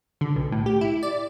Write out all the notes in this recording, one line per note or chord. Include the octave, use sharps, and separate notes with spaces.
D3
B1
A2
G4
E4
D5